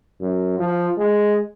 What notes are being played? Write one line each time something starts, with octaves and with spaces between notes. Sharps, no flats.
F#2
F3
G#3